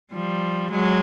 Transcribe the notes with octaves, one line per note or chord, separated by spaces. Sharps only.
F3 G3
F#3 G#3